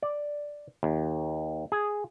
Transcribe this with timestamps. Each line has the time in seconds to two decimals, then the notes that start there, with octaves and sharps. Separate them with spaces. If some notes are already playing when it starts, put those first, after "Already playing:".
0.03 D5
0.83 D#2
1.72 G#4